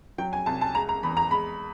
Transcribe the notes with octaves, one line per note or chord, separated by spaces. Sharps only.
F#3 G5
G#5
C2 A5
A5
G#3 A#5
A#5
E2 B5
A#5
G#3 B5